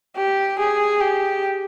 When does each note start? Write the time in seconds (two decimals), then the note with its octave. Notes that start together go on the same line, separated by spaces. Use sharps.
0.16 G4
0.59 G#4
1.01 G4